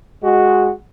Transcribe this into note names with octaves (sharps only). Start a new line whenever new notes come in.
G#3 F#4